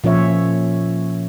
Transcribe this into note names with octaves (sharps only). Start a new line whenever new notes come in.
A#2 F3 C#4 C#5 E5